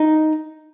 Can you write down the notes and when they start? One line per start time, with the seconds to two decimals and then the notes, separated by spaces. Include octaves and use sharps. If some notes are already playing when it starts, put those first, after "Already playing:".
Already playing: D#4